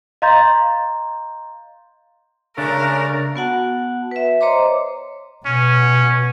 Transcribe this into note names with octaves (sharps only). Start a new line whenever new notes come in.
D#5 F5 A#5 C6 G6 A6
C#3 G#3 A3 D4 A#4
B3 F#4 F#5 A5
B4 E5
C5 C#5 D#5 A#5 C6 D6
B2 C#4